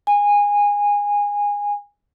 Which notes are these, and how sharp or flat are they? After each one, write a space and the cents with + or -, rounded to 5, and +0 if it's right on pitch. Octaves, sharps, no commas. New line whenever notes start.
G#5 -20